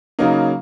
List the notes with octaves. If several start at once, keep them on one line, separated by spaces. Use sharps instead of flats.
C#3 F#3 A#3 D#4